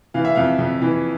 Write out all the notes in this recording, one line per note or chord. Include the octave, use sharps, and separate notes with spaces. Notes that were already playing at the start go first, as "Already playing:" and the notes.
E3 F5
E5
F2 F5
F2
E3